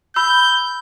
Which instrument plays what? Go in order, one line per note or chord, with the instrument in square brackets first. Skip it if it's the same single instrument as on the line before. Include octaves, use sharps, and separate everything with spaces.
[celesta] B5 E6 [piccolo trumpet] G6